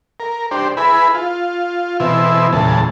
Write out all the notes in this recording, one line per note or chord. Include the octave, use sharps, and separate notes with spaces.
A#4
D4 G4 C5
E4 G#4 B4 B5
F4
B2 E3 C4 E4
E2 A#2 C#3 G#3 A5